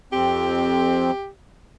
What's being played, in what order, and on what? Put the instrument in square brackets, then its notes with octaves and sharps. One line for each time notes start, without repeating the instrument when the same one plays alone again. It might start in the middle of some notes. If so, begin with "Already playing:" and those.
[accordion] F2 C4 [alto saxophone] G4